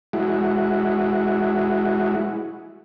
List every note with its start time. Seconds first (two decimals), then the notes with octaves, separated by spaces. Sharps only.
0.13 G#3 E4 F#4